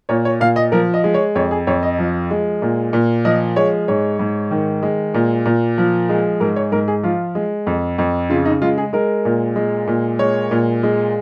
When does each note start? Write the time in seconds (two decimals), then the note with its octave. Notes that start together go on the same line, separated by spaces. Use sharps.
0.09 A#2 C#5
0.25 C#5
0.40 A#2 F5
0.56 D#5
0.72 F3 A#4
0.94 D#5
1.04 G#3
1.14 C#5
1.35 F2 C#5
1.51 G#4
1.67 F2 C#5
1.83 D#5
1.98 F3
2.31 G#3
2.62 A#2
2.93 A#2
3.25 F3 D#5
3.56 G#3 C#5
3.88 G#2 C#5
4.19 G#2
4.51 D#3
4.83 G#3
5.14 A#2
5.45 A#2
5.78 F3
6.09 G#3
6.40 G#2 A#4
6.56 C#5
6.72 G#2 A#4
6.88 G#4
7.03 F3 F4
7.35 G#3
7.67 F2
7.98 F2
8.30 C#3 F4
8.45 D#4
8.62 G#3 F4
8.78 G#4
8.93 G#3 A#4
9.25 A#2
9.56 G#3
9.87 A#2
10.19 G#3 C#5
10.51 A#2
10.83 G#3